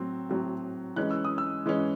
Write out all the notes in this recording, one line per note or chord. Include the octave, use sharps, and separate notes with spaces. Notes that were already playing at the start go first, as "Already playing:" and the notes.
Already playing: A2 F#3 C4
A2 F#3 C4
E3 G#3 C#4 F#6
E6
D#6
E6
E3 G#3 C#4